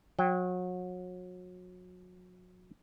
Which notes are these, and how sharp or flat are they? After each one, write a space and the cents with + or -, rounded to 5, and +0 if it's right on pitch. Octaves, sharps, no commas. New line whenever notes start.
F#3 -30 G5 +0